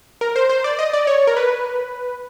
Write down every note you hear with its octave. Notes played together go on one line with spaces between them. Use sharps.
A#4
C5
C5
D5
D#5
D5
C#5
A#4
B4